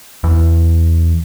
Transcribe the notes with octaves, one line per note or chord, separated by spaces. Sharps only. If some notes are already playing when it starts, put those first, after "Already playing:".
E2